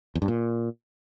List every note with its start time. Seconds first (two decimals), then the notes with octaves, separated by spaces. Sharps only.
0.15 E2
0.22 G2
0.28 A#2